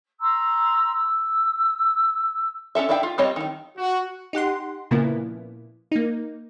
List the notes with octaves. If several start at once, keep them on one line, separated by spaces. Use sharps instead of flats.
A#5 C6 E6
E6
C#4 D4 A4 E5
D4 E4 E5 F5 G5
F4
G3 C4 F4 C#5 D#5
D#3 D#4
F#4
D#4 G4 F#5 C6
A#2 C#3 F3 A#3 B3 E4
A#3 D#4